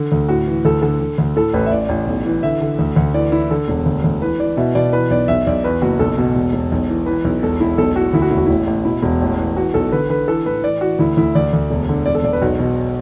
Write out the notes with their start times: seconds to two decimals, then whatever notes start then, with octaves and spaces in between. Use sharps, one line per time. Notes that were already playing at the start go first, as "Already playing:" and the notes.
Already playing: D3
0.12 D2
0.28 A2 F#4
0.47 E3
0.65 D2 A4
0.82 D3 A4
1.00 D3
1.18 D2
1.36 A2 A4
1.53 A1 B4
1.66 E5
1.72 A1 D5
1.89 A1
2.07 B1
2.26 E3
2.43 D3 E5
2.61 D3
2.79 D2
2.96 D2
3.14 E3 D5
3.32 E3 E4
3.50 D3 A4
3.68 E1
3.86 D2
4.04 D2
4.22 E3 B4
4.39 E3 D5
4.57 B2 E5
4.75 B2 D5
4.93 E3 B4
5.10 B1 D5
5.28 B1 E5
5.47 B1 D5
5.64 E2 B4
5.82 F#1 F#4
5.99 B1 A4
6.18 B2
6.35 E1
6.53 E1
6.72 B1
6.89 E3
7.06 E3 B4
7.24 B1
7.43 E1 A4
7.60 E1 E4
7.78 B1 A4
7.96 A2 F#4
8.13 D2 E4
8.22 F#4
8.30 E1 E4
8.38 F#4
8.46 A1 E4
8.67 A1
8.85 B2 E4
9.03 E1
9.21 A1
9.38 E3
9.57 E3 F#4
9.74 B1 A4
9.92 D3 B4
10.10 D3 B4
10.28 E3 A4
10.46 A2 B4
10.64 E3 D5
10.81 E3 F#4
10.99 D2 E4
11.17 D2 E4
11.35 D2 D5
11.53 D2
11.70 E1
11.89 D3
12.06 E1 D5
12.15 A4
12.23 E1 D5
12.33 B4
12.42 B1 F#4
12.59 B2